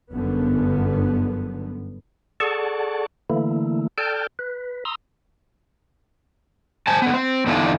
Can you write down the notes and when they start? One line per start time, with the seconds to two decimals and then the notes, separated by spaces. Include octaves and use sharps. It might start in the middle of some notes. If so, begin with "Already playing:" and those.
0.12 G1 F#2 D3 B3
2.40 G#4 A4 D5 F#5 A5 C#6
3.30 D3 E3 A3 A#3 E4
3.98 A4 D5 G5 A5 F6 G6
4.39 B4
4.85 A#5 C6 D#6 E6
6.87 C5 G#5 A5
7.02 D3 B3
7.14 C4
7.46 E2 D3 B3 D4 D#4 F4